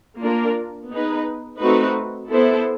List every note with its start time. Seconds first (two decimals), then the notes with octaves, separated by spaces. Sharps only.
0.20 A#3 D4 F4 A#4
0.90 B3 D#4 G#4 B4
1.59 A3 C4 D#4 F#4 B4
2.30 B3 E4 A4 C5